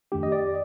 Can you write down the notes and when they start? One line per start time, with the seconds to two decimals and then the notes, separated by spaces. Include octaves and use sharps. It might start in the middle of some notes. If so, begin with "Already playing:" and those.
0.12 F2 D#3 A3 D4 G4
0.23 D#5
0.32 D5